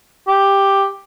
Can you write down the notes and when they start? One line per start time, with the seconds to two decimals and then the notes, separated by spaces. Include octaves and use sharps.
0.28 G4